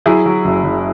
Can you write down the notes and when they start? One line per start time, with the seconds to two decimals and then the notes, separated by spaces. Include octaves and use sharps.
0.06 F#3 E4 G#4
0.26 F#3
0.45 F#1
0.64 F#1